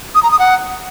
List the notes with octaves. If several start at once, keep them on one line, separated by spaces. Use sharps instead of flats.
D#6
A#5
D#6
F#5